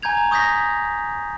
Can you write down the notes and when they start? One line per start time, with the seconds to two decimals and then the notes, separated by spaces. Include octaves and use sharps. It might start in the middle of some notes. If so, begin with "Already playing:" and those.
0.03 G#5 A#5 G6 G#6 F7
0.31 C#6 D#6 G6 A#6 B6